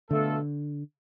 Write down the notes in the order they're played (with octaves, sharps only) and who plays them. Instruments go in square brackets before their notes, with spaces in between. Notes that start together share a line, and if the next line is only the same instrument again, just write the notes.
[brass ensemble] B2 A3 F4 A4 [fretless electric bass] D3